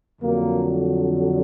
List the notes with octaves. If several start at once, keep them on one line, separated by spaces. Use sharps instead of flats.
F2 D3 F#3 A#3